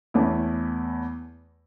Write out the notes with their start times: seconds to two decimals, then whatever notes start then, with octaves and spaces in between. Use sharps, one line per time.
0.14 E2 E3 A3 C#4 E4